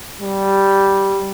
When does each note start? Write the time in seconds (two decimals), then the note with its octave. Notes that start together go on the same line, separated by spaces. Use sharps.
0.21 G3